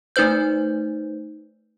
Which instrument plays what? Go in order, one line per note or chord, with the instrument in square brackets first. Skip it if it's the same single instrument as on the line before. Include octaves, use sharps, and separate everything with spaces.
[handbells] A3 D#4 B4 C5 G6